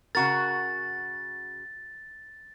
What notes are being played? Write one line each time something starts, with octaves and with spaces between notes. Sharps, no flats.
C#3 F#4 A#4 A6